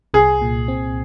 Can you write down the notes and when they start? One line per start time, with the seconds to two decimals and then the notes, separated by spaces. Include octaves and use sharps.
0.14 C2 G#4
0.41 A#2
0.68 C4